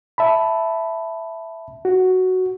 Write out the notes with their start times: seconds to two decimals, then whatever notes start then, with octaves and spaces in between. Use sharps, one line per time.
0.18 E5 A5 B5
1.85 F#4